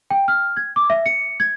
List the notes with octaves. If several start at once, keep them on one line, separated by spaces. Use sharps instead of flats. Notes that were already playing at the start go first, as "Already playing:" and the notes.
G5
F6
G#6
D6
E5
C#7
G#6